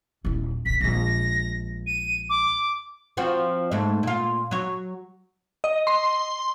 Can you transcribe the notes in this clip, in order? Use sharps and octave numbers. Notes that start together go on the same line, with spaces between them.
D#1 E4
B1 D3 B6
A#1 G#3 A#6
D#7
D6
F3 C4 F#4
G#2 A3
A#2 F4
F#3 C#5
D#5
C6